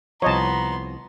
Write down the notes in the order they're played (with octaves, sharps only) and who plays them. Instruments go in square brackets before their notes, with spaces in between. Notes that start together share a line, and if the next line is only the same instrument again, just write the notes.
[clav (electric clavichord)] C2 F3 [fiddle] B3 C6 [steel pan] C#5 D#5 A5 [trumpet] A#5